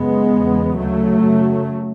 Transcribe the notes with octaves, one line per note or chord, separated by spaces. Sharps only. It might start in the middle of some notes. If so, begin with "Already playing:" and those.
Already playing: F#2 C#3 G#3 B3
E2 C#3
D2 C#3 F#3 A3
F#2
C#3